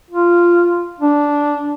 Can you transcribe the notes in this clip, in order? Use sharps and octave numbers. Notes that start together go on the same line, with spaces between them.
F4
D4